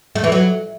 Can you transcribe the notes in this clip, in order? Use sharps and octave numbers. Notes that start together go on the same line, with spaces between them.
A3
E3
F#3